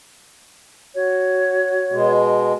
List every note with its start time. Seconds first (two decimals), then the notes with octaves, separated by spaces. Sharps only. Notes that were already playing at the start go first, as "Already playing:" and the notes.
0.95 F#4 C#5
1.92 B2 G#3